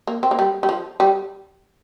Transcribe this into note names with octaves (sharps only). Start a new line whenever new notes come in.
A#3
C4
A#3
G3
G3
F3
G3